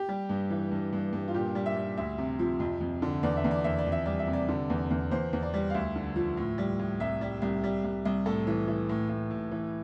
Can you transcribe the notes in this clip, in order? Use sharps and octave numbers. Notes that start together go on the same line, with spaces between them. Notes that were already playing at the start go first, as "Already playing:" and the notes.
Already playing: G4
G3
G2
E3
G2
G2
G2
F4
A#2 G4
G3
E5
G3
D2 E5
C3
F3
F2
F2
D3
E2 D5
E5
E2
D5
E2 E5
D5
F2
E5
G3 D5
E5
C3
D5
D3
E2
E2
E2 C5
E2
D5
G3
F5
D2 E5
D3
F3
A2
G3
A2
C2 E5
G3
C2
G3
C2
C2
A2 A4
E3
E3
A2
A2
A2
E3